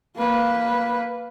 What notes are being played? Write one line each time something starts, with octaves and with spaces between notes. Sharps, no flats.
A#3 B4